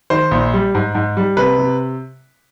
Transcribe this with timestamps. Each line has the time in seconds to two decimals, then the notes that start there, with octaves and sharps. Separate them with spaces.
0.10 D#3 C5
0.31 A#1
0.54 G3
0.75 G#2
0.95 G#2
1.17 G3
1.37 C3 B4
1.58 C3